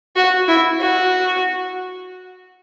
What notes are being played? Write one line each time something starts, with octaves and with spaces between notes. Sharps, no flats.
F#4
E4
F#4